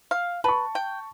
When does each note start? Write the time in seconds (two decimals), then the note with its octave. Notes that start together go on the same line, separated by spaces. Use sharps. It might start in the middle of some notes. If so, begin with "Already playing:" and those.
0.11 F5
0.44 B4 A5 C#6
0.75 G5